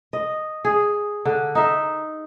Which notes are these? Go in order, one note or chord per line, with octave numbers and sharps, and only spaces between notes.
D#5
G#4
D3
D#4 E5